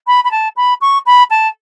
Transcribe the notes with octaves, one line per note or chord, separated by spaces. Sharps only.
B5
B5
A5
B5
C#6
B5
A5